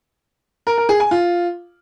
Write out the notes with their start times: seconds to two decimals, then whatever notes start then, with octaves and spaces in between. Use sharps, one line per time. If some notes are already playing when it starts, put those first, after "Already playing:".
0.67 A#4
0.78 A#4
0.89 G#4
1.00 G#5
1.11 F4